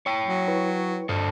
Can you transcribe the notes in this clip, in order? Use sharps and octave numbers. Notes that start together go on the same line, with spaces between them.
C#5 G5
F#3
E4 B4
G2 D4 A4 C5